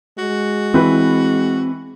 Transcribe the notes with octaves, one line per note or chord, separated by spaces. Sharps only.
G#3 F#4
E3 C4 B4